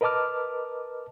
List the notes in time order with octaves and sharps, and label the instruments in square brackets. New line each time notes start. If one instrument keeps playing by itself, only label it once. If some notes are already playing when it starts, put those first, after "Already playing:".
[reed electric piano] A#4 B4 D#5 A5 D6 F6